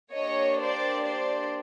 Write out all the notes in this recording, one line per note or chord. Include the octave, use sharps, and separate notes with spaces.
A#3 D4 G4 C#5 D#5
C5 D5
C5 D5